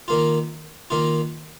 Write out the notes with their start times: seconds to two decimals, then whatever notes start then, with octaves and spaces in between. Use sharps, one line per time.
0.08 D#3 A#3 F4
0.90 D#3 A#3 F4